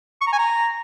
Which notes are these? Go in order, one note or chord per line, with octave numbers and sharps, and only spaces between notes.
C#6
A#5
G#5
A#5